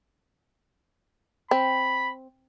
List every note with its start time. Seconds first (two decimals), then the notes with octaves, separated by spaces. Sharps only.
1.51 C4 B5